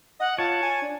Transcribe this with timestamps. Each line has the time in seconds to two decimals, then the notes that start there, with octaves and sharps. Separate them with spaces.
0.20 D#5 F#5
0.39 F4 C#5 A5
0.63 G#5
0.82 D4